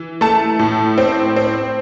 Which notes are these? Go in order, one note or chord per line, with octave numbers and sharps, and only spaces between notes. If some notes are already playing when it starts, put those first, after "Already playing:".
Already playing: E3
A3 A5
A2
C4
C4